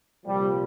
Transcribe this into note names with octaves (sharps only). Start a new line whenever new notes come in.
C2 A#2 F3 G3